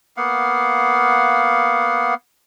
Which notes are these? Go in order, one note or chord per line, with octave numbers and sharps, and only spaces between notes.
A#3 B3 F5 F#5